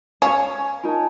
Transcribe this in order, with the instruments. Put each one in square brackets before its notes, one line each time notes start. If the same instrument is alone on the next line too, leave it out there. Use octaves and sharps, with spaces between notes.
[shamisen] C#4 [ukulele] C#5 F5 [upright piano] G#5
[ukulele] D#4 A#4 [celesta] F4 A5